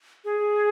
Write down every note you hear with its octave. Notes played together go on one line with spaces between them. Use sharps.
G#4